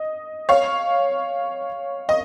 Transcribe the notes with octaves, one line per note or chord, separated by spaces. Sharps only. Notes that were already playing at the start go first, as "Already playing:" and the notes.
Already playing: D#5
C#5 F5
D#5